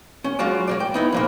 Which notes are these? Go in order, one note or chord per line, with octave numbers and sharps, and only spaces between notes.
C#4
F#3 G#3 F4 F#4 D5
G#3 A#3 D5
G5
B3 D#4 E4
F2 A#2 A#3